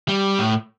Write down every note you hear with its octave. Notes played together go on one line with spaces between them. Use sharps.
G3
A2